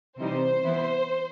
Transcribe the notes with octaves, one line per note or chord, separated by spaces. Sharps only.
C3 E3 G3 D#4 C5
E3 B3 E4